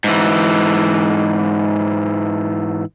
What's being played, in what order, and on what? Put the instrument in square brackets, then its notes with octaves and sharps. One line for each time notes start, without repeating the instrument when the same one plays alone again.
[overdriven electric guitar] G#2 E3